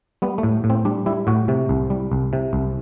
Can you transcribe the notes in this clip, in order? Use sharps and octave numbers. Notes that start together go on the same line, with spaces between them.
G3 B3
A3
A2
A2
C4
G3 D4
G3 E4
A2 F#4
C3
C2
G3
C2
C3
C2